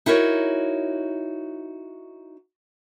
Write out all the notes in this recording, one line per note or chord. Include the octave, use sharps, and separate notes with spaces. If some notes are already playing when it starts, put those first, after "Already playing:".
D#4 E4 F#4 A#4 C#5